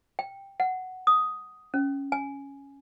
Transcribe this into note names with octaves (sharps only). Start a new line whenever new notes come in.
G5
F#5
D#6
C#4
G#5